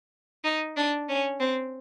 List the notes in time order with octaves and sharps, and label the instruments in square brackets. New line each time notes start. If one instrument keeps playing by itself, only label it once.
[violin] D#4
D4
C#4
C4